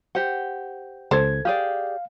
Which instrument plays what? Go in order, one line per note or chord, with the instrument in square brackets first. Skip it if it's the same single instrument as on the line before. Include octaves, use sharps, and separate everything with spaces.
[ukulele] G4 C5 F#5
[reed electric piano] C#2 G#6 [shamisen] A4 C5
[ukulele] G4 G#4 D5 [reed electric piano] F5